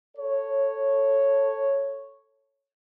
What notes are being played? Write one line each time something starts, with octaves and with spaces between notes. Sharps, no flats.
A4 C#5